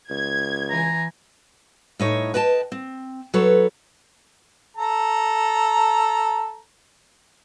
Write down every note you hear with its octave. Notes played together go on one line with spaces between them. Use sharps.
C#2 G#6
E3 G#5 A#5
A2 D#4 C#5
B4 D#5 G5 A5
C4
F#3 A4 B4 C#5
A4 A#5